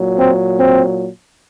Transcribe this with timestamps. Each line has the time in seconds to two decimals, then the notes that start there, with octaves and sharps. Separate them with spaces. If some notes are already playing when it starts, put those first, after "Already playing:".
Already playing: A#2 F#3
0.17 C4
0.58 C4